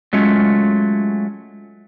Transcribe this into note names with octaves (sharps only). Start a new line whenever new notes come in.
F#3 G#3 A3 C#4 F4